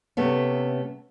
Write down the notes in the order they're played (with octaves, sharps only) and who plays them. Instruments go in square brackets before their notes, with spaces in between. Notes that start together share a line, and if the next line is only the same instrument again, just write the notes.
[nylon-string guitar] C3 A3 B3 C#4